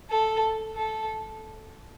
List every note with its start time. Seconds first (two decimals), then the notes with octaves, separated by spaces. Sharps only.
0.10 A4
0.76 A4